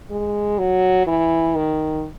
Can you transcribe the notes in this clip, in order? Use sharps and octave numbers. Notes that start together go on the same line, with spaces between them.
G#3
F#3
E3
D#3